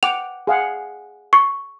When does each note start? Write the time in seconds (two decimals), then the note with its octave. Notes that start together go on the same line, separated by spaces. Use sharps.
0.03 F#5 G5 D6 F7
0.47 G#4 F5 F#5
1.33 C#6